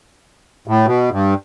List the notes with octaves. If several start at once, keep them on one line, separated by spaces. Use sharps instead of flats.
A2
B2
G2